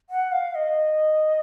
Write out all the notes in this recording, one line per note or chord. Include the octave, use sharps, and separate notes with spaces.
F#5
F5
D#5